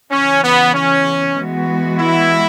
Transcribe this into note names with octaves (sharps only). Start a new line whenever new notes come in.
E2 C#3 E3 C#4
B3
C#4
E3 G#3 B3 F#4
E4